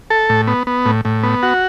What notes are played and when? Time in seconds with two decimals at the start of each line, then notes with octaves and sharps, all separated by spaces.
0.10 A4
0.29 A2
0.47 B3
0.67 B3
0.86 A2
1.05 A2
1.23 B3
1.43 F#4